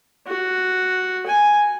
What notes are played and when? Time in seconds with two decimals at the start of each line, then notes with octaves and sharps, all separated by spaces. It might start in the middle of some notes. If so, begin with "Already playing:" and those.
0.27 F#4
1.27 G#5